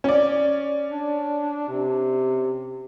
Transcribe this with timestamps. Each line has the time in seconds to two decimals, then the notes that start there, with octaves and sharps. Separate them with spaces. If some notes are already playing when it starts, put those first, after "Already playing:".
0.04 C#4 D5
0.91 D4
1.69 C3